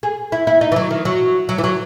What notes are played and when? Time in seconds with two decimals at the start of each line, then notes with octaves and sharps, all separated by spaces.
0.03 G#4
0.32 E4
0.47 E4
0.61 D#4
0.72 E3
0.76 F#3
0.91 D#3
1.05 F#3
1.49 F#3
1.58 E3
1.64 F#3